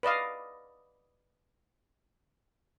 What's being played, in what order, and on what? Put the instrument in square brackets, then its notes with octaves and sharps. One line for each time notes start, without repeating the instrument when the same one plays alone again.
[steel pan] B4 D5 D#5 F5